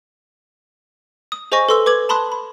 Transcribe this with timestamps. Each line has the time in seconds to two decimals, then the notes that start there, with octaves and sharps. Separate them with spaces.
1.32 D#6
1.52 G#4 C5 D#5 G#5 C#6 A#6
1.69 A4 B4 C6 E6 G7
1.86 B4 D6 G#6 F#7
2.09 A5 B5 C6 D#6 F#6
2.32 B5